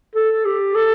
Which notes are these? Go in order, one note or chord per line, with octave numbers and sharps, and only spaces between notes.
A4
G4
A4